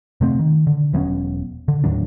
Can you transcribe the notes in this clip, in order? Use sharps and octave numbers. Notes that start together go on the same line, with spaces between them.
C3 A3 C4
D#3
D3
E1 F#3 B3 C#4
D3
D#2 A2 F#3 D4